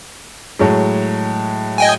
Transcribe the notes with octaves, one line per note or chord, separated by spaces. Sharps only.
A2 F#3 G#3
D#5 G5 G#5